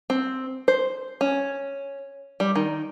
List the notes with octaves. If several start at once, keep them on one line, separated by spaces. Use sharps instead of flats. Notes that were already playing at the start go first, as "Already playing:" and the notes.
C4
C5
C#4
G3
D#3